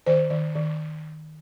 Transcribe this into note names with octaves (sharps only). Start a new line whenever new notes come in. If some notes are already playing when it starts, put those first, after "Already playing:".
D#3 C5
D#3
D#3